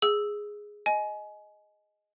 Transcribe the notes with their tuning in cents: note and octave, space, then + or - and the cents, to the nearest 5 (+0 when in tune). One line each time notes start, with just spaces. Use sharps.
G#4 +0 E6 +0
D#5 +0 G#5 +25